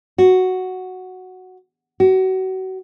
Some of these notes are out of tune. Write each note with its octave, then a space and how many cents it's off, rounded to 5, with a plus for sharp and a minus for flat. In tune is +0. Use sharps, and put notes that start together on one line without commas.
F#4 +0
F#4 +30